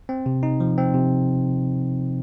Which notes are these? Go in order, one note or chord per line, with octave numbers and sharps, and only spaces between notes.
C4
C3
D#4
F3
C4
C3